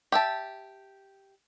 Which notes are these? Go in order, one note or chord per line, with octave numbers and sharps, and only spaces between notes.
G4 E5 A5